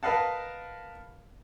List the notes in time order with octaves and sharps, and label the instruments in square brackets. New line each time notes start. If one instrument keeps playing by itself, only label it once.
[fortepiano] A#4 B4 D#5 F5 F#5 A5